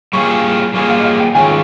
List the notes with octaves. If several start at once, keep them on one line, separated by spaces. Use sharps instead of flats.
G3 A#3 F4 G#4 C#6
G3 A#3 F4 G#4 C#6
F5
D#5
F5
G5
D#3 G#3 C#4 F4 G#5